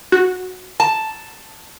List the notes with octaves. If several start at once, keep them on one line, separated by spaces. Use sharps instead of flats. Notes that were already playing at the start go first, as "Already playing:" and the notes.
F#4
A5